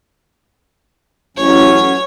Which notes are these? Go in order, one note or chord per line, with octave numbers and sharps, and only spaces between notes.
A1 F#3 C#4 C#5